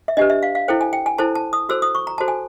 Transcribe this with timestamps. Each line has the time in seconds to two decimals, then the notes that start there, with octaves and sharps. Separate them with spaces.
0.08 E5
0.17 D4 G4 B4 D#5
0.30 E5
0.43 F5
0.55 F5
0.68 E4 A4 C5 G5
0.81 G#5
0.93 G5
1.06 G#5
1.18 E4 A4 C5 A5
1.35 A5
1.53 D#6
1.69 F#4 A4 C5 E6
1.82 D#6
1.95 C#6
2.07 A#5
2.18 F#4 A4 C5 A5
2.28 G#5